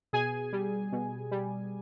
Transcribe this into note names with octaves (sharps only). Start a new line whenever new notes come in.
B2 G#4 G#5
G3
B2
G3